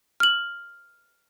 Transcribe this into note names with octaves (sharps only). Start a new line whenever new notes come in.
F6 F#7